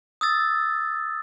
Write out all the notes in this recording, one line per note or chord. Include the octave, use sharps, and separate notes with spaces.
D#6 E6 A6